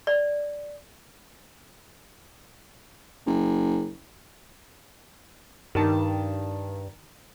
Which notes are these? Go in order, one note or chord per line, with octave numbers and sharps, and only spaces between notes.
D5
F#1
G2 D#3 A5